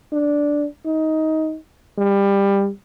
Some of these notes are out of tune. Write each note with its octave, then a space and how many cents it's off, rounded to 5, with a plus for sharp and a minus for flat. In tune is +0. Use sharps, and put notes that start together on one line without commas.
D4 -5
D#4 +15
G3 +20